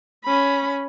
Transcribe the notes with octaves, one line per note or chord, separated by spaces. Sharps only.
C#4 B5